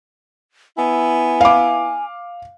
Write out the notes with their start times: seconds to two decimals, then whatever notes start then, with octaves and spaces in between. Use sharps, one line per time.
0.77 B3 E4 G#5
1.41 F5 D6